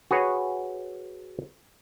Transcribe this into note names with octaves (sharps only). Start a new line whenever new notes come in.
F#4 G#4 B4 C#5